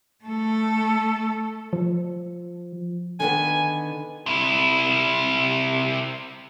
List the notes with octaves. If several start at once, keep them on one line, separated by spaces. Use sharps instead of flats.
A3 A4
F3
D3 D#3 B3 G#5
C3 E4